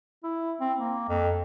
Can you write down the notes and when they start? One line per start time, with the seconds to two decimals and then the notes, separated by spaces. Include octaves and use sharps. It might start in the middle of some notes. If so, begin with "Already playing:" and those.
0.24 E4
0.61 C4
0.79 A#3
1.09 F2